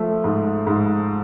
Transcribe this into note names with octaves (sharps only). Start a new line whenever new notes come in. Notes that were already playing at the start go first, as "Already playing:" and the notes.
Already playing: F3 A3
G#2
G#2